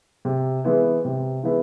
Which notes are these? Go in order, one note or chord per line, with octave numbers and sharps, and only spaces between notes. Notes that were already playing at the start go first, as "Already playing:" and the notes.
C3
E3 G#3 B3 E4
C3
E3 G#3 B3 E4